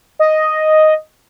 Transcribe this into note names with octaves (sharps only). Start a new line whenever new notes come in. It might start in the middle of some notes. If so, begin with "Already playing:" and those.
D#5